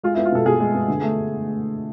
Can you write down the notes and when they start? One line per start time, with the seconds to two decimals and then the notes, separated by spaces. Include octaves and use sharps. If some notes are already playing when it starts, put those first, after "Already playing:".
0.03 G#3 F4
0.15 E4
0.17 B3
0.25 F4
0.32 B2 A4
0.46 B2 G#4
0.60 G#3
0.74 B3
0.88 D3
1.02 A3